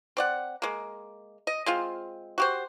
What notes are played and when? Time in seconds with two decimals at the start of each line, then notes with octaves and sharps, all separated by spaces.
0.17 C4 D5 F#5
0.62 G#3 A#3
1.47 D#5
1.66 G#3 C4 F4
2.38 F#4 G4 C5